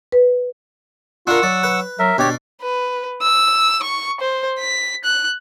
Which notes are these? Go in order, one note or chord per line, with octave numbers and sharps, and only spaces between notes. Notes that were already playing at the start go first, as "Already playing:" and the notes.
B4
D4 F4 A#4 F#5 C#6 E6
F#3 D5
B4
F#3 A#4 E5
B2 D4 G4 C#5 D5
B4
E6
C#6
C5
B6
F#6